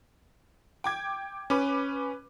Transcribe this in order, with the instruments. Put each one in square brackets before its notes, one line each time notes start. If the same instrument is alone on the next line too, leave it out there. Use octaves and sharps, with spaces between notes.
[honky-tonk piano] G5 D6 G#6
[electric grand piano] C#4 [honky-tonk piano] B4 D6